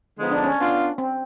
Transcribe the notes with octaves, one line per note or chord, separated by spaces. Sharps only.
D3 F3 G#3 B3 D#4
D4
C#4
B3 D4 F4
C4